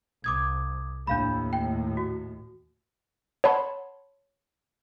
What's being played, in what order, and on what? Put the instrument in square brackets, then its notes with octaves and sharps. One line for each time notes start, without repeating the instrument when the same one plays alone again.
[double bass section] C2 [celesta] D6 D#6 G#6
[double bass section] D#2 A2 [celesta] D4 F5 B5
[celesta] G5
F#4
[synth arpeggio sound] C#5 F#5 A5 B5 C6